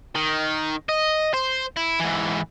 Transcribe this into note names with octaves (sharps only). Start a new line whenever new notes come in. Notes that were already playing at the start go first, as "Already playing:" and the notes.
D#3
D#5
C5
E4
G#2 E3